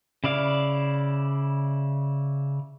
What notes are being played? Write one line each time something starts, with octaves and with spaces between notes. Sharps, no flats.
C#3 E4 D5 F5